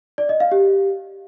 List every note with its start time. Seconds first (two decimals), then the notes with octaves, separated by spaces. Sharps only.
0.18 D5
0.29 D#5
0.40 F5
0.52 G4